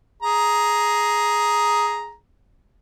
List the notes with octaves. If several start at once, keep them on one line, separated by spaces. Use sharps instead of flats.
G#4 A#5